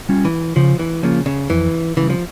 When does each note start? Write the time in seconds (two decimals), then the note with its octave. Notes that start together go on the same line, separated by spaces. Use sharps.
0.09 G3 C#4 F4
0.25 E3
0.56 C#3 F3
0.79 E3
1.03 C#3 F3 A#3 F4
1.26 C#3
1.50 F2 E3
1.97 C#3 E3 G3
2.10 F3